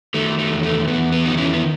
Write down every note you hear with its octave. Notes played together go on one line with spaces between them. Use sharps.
D#3 A3
A3
E2
A3
E2 B3
B3
D#3 D#4
C#4 E4
B3